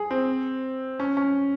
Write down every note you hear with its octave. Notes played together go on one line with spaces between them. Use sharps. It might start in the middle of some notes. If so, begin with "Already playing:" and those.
Already playing: G#4
C4
C#4
C#4